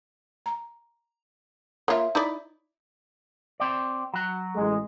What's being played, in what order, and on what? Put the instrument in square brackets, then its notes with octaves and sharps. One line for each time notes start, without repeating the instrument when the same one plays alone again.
[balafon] A#5
[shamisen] A#3 F4 [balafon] C#5 E5
[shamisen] D#4 E4 D5
[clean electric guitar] C4 D5
F#3 F#4
[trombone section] A1 G#3